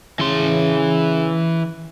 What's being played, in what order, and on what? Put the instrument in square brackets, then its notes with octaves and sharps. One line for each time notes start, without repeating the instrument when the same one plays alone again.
[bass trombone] C#3 [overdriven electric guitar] E3 C6